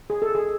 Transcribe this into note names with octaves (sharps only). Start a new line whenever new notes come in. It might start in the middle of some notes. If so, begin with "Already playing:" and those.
G#4
A4
G#4